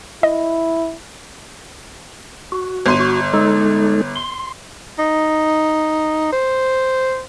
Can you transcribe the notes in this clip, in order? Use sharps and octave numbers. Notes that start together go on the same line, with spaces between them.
E4 D#5
F#4
G1 C6 D#7
F#4
G#3 D#4 A4
C6
D#4
C5